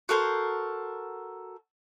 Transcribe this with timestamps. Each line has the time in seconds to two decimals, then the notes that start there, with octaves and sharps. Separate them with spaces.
0.09 F#4 A4 A#4 C5